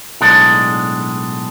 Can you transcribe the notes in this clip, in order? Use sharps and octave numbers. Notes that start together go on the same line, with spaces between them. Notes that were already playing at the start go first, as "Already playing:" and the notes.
B1 A2 G#3 D4